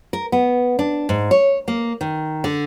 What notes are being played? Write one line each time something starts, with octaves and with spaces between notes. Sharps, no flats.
A#4
B3
D4
G#2
C#5
A#3
D#3
D3